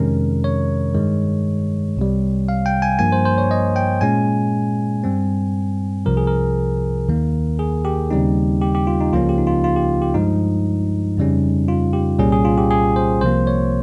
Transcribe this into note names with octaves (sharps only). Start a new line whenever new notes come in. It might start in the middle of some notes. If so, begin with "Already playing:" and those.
Already playing: F2 C3 D#3 G#3 C#4 A#4
C#5
G2 D#3 G#3
C2 C3 G3
F5
G5
G#5
G2 F3 A#3 G#5
C5
C5
C#5
D#5
G5
A#2 G#3 C#4 G#5
G2 G3 C4
C2 C3 F3 A#4
G#4
A#4
D#2 D#3 A#3
G#4
G4
D#2 C#3 G3 C4 D#4
G4
G4
F4
D#4
C#2 C#3 F3 A#3 C#4 F4
G4
D#4
F4
F4
G4
G4
G2 F3 G#3 D#4
F2 C#3 G3 C#4
F4
G4
C2 A#2 G3 C#4 G#4
G#4
F4
G4
G#4
C5
C2 C3 F3 A#3 C5
C#5